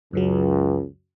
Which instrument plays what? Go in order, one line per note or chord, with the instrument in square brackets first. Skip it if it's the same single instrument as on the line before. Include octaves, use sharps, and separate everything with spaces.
[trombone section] C#2 [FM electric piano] F#2 C#3 F#3